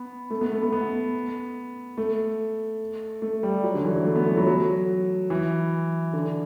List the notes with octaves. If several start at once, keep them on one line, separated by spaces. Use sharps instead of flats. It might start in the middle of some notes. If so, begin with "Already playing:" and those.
Already playing: B3
A3
B3
A3
B3
B3
A3
A3
G3
F#3
D3
E3
F#3
A3
B3
A3
F#3
F#3
E3
D3